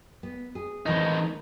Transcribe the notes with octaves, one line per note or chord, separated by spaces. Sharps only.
B3
G#4
A2 D#3 E3 C4 D#4